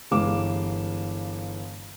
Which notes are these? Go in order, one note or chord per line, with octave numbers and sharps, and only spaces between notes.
G1 E3 G#3 F5 D6 E7